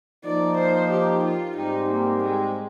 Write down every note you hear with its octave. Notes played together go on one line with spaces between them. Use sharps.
F3 A#3 D#4 D5
C5
G4
F4
G#2 G3 C4 D#4 G4
A#3
G#3